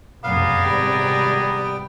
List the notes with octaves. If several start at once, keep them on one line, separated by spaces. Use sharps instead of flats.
F1 B1 F#2 B3 G#4 D5 F5 A#5
G#1 C3 D#3 G3 G5